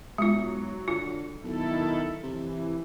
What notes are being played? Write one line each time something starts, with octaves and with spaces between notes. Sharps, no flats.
B1 F#3 G#3 F4
D3 F4
B1 D#3 E4 A4
C3 E3